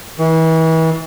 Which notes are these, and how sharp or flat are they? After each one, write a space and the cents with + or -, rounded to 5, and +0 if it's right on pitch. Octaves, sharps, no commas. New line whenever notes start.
E3 -35